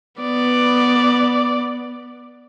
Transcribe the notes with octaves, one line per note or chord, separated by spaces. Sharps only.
B3 D5